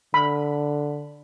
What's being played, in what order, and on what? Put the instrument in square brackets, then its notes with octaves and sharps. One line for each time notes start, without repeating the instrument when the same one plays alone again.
[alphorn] D3 [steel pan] B5